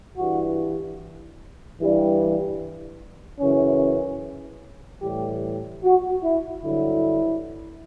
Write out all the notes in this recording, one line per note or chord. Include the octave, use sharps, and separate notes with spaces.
G2 E3 G3 F#4
G2 E3 G3
F#2 C#3 E3 C#4
A2 E3 G3 G4
F#4
E4
G2 D3 F#3 E4